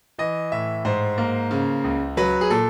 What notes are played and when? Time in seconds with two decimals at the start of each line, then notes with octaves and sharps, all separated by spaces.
0.19 E3 D#5
0.52 A2 E5
0.85 G#2 C5
1.18 A#3
1.51 C#3
1.84 C#2
2.17 F#3 B4
2.41 G#4
2.50 A#2 A4